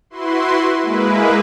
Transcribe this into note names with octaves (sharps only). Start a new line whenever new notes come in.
E4 F#4 B4 C6
G#3 A#3 E4 B4